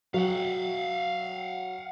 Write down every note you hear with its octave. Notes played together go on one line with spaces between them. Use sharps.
F#3 F5 F#5